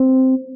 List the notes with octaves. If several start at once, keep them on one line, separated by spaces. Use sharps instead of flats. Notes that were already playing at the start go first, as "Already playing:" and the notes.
Already playing: C4